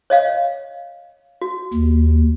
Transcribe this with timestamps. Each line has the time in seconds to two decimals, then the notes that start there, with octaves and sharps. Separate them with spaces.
0.10 C#5 D#5 F5
1.42 F#4
1.74 D#2